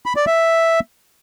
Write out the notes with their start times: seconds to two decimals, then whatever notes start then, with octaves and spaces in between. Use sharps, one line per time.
0.06 B5
0.16 D5
0.27 E5